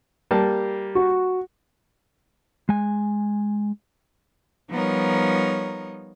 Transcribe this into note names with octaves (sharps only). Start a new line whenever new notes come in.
G3 A#3 A5
F#4
G#3 G#5
F3 G3 B3 D#4 A#4 C#5